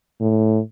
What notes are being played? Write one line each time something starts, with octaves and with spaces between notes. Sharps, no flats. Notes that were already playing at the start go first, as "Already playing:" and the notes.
A2